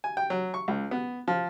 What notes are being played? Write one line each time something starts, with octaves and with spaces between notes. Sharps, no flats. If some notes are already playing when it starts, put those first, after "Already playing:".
G#5
G5
F#3
C#6
C#2
B3
F3